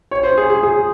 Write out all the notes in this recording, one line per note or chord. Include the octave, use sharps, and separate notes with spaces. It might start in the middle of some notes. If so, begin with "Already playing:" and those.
C#5
C5
G#4
G#4
G#4